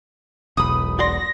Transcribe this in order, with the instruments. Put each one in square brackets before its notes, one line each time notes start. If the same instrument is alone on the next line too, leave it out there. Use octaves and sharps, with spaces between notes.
[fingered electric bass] E1 B1 [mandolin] B5 D#6
[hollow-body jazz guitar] F#4 D5 C6 [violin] A#6